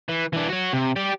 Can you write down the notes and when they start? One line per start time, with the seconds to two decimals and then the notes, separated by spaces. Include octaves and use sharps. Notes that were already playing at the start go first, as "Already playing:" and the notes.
0.09 E3
0.33 E3 D4
0.49 F#4 C#5
0.73 C3
0.96 G4 D5